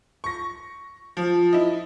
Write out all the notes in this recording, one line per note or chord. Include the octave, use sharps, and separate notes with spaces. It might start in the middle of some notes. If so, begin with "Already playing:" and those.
C#6 A#6
F3
E4 D#5